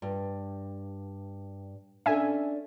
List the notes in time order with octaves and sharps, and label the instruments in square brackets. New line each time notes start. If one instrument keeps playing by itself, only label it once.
[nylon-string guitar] G2
[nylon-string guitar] C#4 D4 A4 [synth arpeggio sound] E5 G#5